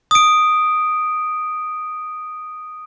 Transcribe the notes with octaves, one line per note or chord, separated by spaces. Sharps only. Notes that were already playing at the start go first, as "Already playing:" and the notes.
D#6 D7